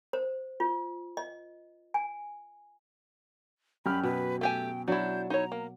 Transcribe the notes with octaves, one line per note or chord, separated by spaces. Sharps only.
C5
F4
D#5
G#5
F#2 G4 B5 F6
B2 B4
A3 G4 G5 G#5
F#3 D4 E4 G6
D#4 E4 C#5 A#5
A#3